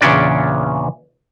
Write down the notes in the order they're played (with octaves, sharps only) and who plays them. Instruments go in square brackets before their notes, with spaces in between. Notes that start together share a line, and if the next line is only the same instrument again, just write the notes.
[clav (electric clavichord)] E2 A#2 C#3 C#4 D4 D5